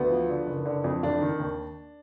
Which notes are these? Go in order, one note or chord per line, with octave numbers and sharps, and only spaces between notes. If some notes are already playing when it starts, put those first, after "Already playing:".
Already playing: D2 B3
F3
D3
F#1
D3
F2
F1 D4
D#3
D#2